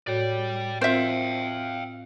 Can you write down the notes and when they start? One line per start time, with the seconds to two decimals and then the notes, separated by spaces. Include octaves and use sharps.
0.07 A2 F#4 C#5 D5 G5
0.81 C4 F4 A#4 C5 E5 F5 G5